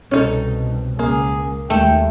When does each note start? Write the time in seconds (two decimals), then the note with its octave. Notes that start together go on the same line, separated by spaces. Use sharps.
0.11 C2 B2 C#4 D#4 A4
0.99 C#2 A#3 G#4
1.70 D#2 G#3 A3 G5